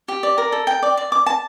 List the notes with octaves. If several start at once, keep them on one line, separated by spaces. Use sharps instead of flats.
G4
D5
A#4
A4
G5
D5
D5
D6
A5